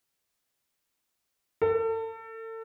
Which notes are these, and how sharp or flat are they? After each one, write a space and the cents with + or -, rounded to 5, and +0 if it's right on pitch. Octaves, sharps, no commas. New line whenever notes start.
A4 +35